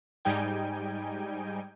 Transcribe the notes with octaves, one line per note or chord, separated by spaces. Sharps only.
G#2 G3 D#4 G5 G#5